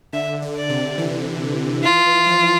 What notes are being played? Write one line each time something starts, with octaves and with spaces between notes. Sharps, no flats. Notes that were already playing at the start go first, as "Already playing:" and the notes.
D3 E5
D3
D5
C3
E3
E3 F4
F3